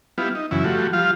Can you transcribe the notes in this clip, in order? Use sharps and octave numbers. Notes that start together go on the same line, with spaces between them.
G3 B3 E4 F4
D#4
F#2 C#3 E3 E4
F3 G3 A3 F#4
F3 G3 F4 F5